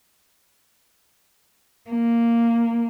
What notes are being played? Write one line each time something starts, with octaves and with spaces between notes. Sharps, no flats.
A#3